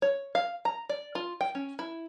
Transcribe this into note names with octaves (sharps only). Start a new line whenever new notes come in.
C#5
F5
A#5
D5
F4
G5
C#4
E4